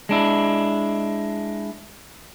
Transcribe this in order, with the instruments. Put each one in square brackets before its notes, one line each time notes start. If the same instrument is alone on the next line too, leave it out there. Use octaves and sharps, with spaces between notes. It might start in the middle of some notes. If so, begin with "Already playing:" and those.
[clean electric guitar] G#3 D4 E4